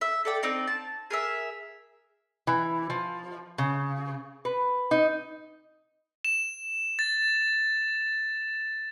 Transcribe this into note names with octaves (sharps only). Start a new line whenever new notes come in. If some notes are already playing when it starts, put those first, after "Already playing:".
E5
A4 D5 G5
C4 D#4 D5
A5
G#4 A#4 E5
E3
F3
C#3
B4
D#4
E7
A6